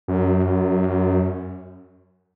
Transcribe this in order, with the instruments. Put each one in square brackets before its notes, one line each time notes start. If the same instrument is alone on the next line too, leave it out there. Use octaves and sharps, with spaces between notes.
[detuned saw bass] F#2